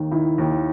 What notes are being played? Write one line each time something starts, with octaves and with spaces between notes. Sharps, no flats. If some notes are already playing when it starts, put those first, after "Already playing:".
Already playing: D#2 D#3
D#3 E4
D#2